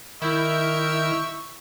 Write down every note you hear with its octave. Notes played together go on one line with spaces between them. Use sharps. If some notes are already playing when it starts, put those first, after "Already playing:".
D#3 E4 A#4 E5 C#6 E6 G6